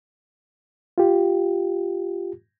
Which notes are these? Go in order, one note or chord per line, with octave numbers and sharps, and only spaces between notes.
F4 G4